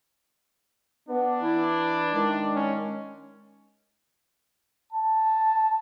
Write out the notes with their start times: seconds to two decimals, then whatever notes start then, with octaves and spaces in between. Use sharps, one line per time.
1.09 B3 D4
1.42 E3 E4
2.14 D#3 G#3
2.55 C#4
4.92 A5